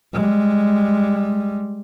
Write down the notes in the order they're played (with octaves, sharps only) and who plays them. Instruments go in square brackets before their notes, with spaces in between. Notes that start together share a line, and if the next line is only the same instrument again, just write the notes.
[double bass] G3 G#3